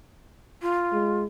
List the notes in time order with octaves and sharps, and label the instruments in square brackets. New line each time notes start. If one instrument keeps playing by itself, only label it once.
[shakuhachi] F4
[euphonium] G#3